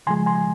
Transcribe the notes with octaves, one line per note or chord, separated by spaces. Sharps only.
C#3 F3 G#3 G#5 C6
G#5 C6